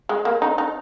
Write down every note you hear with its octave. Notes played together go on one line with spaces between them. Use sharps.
G#3
A#3
D#4
D#4